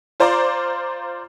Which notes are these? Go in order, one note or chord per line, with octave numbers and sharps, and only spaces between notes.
F4 C5 D5 A#5 D6